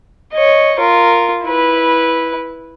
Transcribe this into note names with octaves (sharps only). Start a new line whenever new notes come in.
C#5 D#5
F4 A#4
E4 B4